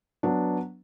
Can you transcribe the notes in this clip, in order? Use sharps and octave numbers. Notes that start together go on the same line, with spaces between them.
F#3 B3 D4